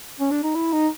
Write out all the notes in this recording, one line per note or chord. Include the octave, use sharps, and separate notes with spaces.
C#4
D4
D#4
E4
D#4